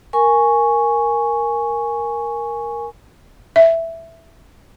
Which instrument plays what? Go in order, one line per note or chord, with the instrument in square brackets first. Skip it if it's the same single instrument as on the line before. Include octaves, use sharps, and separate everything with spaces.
[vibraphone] A#4 G#5 C#6
[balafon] E5